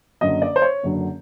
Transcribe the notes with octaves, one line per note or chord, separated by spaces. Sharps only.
F#1 F#2 D3 F#3 D#5
D5
C5
C#5
F#1 F#2 D3 F#3